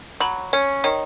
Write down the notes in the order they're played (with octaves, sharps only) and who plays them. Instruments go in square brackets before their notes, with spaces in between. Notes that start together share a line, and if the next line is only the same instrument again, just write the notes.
[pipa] F#3 [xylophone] B5
[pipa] C#4 [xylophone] C#5
[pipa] D#3 [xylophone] C#5